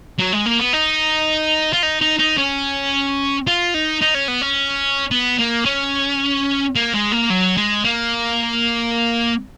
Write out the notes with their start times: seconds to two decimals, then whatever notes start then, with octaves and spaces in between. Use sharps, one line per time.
0.18 F#3
0.32 G#3
0.46 A#3
0.59 B3
0.73 D#4
1.73 F4
1.83 D#4
2.01 D#4
2.19 D#4
2.38 C#4
3.47 F4
3.74 D#4
4.02 D#4
4.15 C#4
4.28 B3
4.42 C#4
5.11 B3
5.39 A#3
5.66 C#4
6.75 A#3
6.94 G#3
7.12 A#3
7.30 F#3
7.57 G#3
7.84 A#3